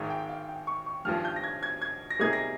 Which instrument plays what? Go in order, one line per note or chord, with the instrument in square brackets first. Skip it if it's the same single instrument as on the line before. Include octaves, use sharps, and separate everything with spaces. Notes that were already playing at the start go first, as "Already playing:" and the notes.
Already playing: [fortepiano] G#1 G#2 D#3 G#3
[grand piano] G5
F5
G5
C#6
C#6
[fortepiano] G#1 G2 F3 [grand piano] F6
[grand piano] G6
A#6
G#6
G#6
G#6
A#6
[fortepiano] C3 G3 A#3 D#4 G#4 [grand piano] G#6
[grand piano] A#6